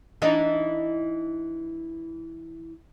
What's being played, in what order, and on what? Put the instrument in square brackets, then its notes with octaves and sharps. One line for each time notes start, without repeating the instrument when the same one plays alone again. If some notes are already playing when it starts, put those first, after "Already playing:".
[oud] E3 D4 D#4